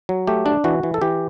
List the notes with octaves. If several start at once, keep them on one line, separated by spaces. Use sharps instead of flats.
F#3
A3 G4
D4
E3 F#4
E3
A4
E3 G4